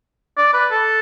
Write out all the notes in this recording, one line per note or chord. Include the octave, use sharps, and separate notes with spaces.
D5
B4
A4